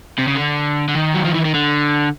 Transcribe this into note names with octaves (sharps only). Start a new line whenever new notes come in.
C3
C#3
D3
D3
D#3
F#3
F3
E3
D#3
D3